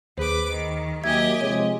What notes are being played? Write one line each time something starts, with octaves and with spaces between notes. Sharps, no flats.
D#2 G#4 B4 C5 D6
D#3
D#2 F#3 G4 D#5 E5 G#5 G#6
C3 F3 G#3 C#5